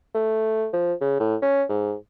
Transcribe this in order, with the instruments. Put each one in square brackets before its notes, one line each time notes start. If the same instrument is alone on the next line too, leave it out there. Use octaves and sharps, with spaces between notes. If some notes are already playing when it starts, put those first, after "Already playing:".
[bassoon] A3
F3
C#3
A2
C#4
G#2